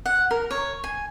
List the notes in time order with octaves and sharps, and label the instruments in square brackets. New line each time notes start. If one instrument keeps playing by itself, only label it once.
[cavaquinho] F#5
A#4
C#5
G#5